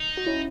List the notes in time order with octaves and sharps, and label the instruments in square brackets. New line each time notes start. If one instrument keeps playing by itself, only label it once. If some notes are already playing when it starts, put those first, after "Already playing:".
Already playing: [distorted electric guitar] D#4
[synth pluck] F#4
C#4 E4